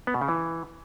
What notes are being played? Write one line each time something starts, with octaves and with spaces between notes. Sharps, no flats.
B3
B2
C#3
E3